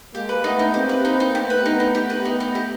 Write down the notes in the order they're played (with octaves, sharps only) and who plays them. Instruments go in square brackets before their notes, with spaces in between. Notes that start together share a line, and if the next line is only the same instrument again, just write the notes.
[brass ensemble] G#3 A#3 [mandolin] G4
[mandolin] B4
[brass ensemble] A3 B3 [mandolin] D#4
[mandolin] D#4
[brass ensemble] A#3 C4 [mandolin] G4
[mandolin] B4
D#4
D#4
[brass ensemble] A3 B3 [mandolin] G4
[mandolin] B4
D#4
D#4
G4
B4
D#4
D#4
G4